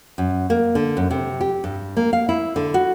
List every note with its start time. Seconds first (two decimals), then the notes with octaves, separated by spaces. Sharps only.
0.18 F#2
0.50 A#3
0.75 D3
0.97 F#2
1.11 C3
1.41 G4
1.64 G2
1.97 A#3
2.13 F5
2.29 E4
2.56 D3
2.74 F#4